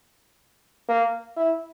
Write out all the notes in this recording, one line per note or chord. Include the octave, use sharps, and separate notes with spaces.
A#3
E4